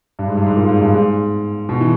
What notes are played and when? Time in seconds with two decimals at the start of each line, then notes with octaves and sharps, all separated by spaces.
0.19 G2
0.28 G#2
0.37 G2
0.46 G#2
0.56 A#2
0.69 G#2
0.81 G2
0.94 G#2
1.69 B2
1.81 E3